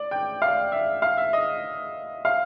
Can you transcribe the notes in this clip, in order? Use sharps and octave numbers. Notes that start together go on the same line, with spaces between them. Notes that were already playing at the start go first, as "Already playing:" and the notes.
Already playing: D5
G5
F5
E5
F5
E5
D#5
F5